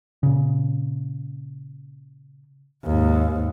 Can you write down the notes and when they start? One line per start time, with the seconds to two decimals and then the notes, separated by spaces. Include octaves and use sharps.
0.23 A#2 C#3
2.85 D#2 G#2